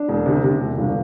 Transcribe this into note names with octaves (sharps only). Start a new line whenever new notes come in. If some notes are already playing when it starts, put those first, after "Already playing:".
Already playing: D4
E1
C3
C3
E1
G1